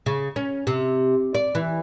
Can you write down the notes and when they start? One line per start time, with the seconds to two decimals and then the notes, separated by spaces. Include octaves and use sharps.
0.06 C#3
0.36 C#4
0.67 C3
1.35 D5
1.55 E3